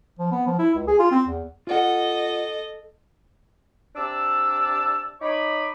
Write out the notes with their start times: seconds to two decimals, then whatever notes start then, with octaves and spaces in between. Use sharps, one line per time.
0.19 F3
0.32 B3
0.47 F3
0.59 E4
0.75 C#2
0.88 G#4
0.99 F4
1.11 C4
1.27 E2
1.67 F4 A4 D#5 F#5
3.95 C3 D4 D5 A5 E6
5.21 D#4 C#5 B5 D6